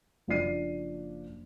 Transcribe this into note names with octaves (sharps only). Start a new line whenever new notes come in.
F#1 F3 D4 D5 C7 D#7